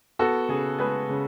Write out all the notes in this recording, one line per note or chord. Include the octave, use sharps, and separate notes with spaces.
B3 F#4 A4
C#3 G#4
G#3 G#4 B4
C#3